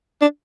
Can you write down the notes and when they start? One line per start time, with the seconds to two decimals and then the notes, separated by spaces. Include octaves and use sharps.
0.21 D4